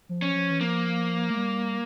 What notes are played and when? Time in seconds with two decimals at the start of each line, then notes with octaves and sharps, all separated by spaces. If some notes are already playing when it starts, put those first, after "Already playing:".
0.09 F3
0.22 C#4
0.35 F3
0.50 E3
0.60 F3 A#3
1.30 A3
1.37 G3